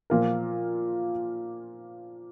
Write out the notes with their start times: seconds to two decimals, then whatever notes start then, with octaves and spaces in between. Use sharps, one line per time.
0.10 A#2 F3 A#3 F4 A#4